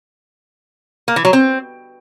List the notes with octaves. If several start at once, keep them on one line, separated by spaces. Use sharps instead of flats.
A#3
E3
F#3
C4